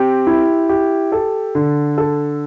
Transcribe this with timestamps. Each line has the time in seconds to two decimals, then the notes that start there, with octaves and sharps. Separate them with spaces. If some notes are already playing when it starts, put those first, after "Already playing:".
Already playing: C4 G4
0.27 E4
0.69 G4
1.12 A4
1.55 D3
1.98 A4